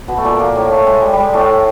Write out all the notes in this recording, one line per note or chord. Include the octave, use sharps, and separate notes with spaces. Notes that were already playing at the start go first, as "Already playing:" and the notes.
B2 B3
A3
A#2 A#3
A#2 A#3
A2 A3
A2 A3
G#3
G3
G3 G#3
A2 A3